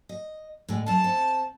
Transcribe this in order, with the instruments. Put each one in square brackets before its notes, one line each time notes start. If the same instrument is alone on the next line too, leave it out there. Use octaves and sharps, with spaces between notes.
[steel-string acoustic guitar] D#5
A2 D3 G#3
[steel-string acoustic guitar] F#2 A#4 F5 [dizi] A5
[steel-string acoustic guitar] C4